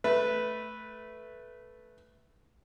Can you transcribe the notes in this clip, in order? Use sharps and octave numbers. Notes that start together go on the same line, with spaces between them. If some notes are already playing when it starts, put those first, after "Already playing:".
A3 B4